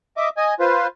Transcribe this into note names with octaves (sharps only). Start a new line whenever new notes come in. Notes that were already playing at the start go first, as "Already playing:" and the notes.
D#5 E5 D6
D#5 G#5
F4 B4 C5